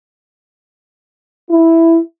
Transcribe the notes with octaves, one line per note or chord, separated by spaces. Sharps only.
E4